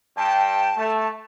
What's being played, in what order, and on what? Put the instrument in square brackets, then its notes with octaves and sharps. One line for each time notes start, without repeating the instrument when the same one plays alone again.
[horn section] G2 G5 [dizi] A5
[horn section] A3